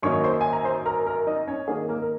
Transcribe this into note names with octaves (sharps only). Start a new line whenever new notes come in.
F#2 D#3 A#3 D#4 C#5 C#6
C5 C6
G#5
A#5
C5 C6
A#4 A#5
A#4 A#5
D#4 D#5
C#4 C#5
D#3 A#3 D#4 G#4
A#3 A#4
A#4